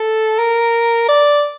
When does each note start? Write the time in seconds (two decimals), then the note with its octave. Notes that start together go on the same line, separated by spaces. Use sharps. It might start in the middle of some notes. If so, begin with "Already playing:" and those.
Already playing: A4
0.39 A#4
1.08 D5